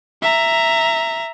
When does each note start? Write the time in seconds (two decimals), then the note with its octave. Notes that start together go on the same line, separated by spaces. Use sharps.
0.22 E5 A#5